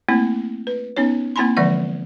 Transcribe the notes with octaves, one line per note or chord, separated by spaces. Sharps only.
A3 A#3 C4 E4
B4
B3 C#4 D#4 C#5
A#3 C4 E4 G#5 B5 C6
D3 E3 F3 G#3 D5 F#5